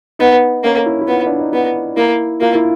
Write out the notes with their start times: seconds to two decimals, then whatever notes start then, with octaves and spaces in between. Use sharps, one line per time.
0.19 B3 D#4
0.64 A#3 C#4
0.86 E4
1.01 E4
1.08 B3 F4
1.26 D4
1.40 D#4
1.52 B3 E4
1.96 A#3 E4
2.41 A#3 F4
2.55 E4